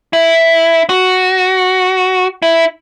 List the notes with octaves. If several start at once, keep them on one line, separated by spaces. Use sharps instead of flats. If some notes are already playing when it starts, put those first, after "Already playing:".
E4
F#4
E4